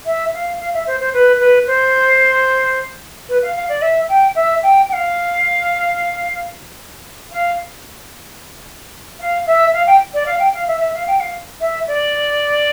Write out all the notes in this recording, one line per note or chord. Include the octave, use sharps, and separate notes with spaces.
E5
F5
F5
E5
C5
C5
B4
B4
C5
B4
F5
F5
D5
E5
G5
E5
G5
G5
F5
F5
F5
E5
F5
G5
D5
F5
G5
F5
E5
E5
F5
G5
F5
E5
D5